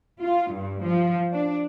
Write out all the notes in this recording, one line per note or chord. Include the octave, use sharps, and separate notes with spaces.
F4
G2
F3
D4